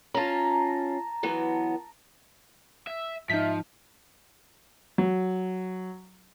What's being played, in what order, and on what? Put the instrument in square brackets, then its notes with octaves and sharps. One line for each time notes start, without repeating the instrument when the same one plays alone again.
[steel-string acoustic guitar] C#4 F4 [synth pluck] A5 A#5
[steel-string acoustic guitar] E3 F#3 B3
[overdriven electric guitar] E5
[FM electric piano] G#2 D#4 [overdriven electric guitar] F3 [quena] E5 [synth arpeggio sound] B6
[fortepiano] F#3